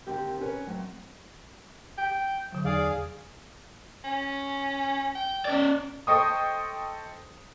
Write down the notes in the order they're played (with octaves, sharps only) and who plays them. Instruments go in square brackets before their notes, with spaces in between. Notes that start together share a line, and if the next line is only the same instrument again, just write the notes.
[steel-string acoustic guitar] D#2 D3 C4 G4 A#4
C#4 A#4 B4 C#5
F#3 A3 C4
[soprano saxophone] G5
[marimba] D3 F#3
[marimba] E2 [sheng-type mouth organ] G#4 F5 [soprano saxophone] D5
[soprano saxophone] C#4
G5
[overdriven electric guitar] C#4 D5
[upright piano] A4 C5 D#5 G5 C#6 D#6